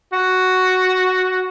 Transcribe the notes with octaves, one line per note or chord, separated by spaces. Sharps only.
F#4